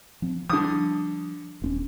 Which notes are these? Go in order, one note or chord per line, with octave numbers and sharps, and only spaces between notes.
F3 C4
D3 F3 G3 D#6
D#1 C4 C#4